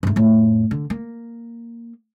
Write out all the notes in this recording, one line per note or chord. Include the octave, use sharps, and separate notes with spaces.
G2 A3
F2 A2
D3
A#3